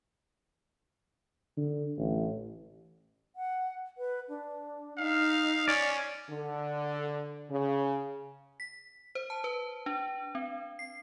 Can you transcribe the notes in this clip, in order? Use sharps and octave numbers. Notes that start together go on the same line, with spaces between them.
D3
A1
F#5
B4
D4
D#4 F5
C#4 D5
D3
C#3
B6
C5
A5
B4
D4
C4
C7